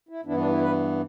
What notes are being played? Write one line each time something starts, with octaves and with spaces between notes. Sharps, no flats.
E4
G2 E3 B3 D4 E4
D4
E4
B4